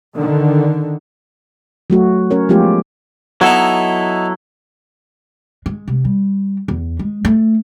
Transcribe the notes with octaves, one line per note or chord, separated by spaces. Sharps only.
D3 D#3
F#3 A3 F#4
C#4 A#4 C#5
F3 G#3 A3 B3 F4 G4
F#3 B3 D#4 E4 A4
G#3
C3
G3
E2
G#3
A3